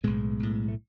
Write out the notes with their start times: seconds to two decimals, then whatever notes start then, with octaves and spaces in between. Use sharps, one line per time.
0.04 B1 A2 G#3 B3
0.40 B1 A2
0.68 A3